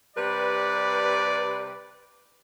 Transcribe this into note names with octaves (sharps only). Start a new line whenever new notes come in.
C3 G3 B4 D5